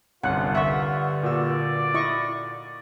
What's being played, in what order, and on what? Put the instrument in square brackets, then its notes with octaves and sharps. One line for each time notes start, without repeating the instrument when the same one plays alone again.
[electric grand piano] G1 C2 [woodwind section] C4 C#4 B4 [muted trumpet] F4 [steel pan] F#5
[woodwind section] G2 D3 [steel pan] E5 [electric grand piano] F#5 C#6
[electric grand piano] A#2 F#4 E6 [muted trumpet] D5
[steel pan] E4 D#5 C#6